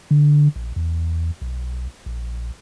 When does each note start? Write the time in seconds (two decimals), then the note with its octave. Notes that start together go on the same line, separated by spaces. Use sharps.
0.11 D3
0.56 A#1
0.76 E2
1.42 B1
2.06 A#1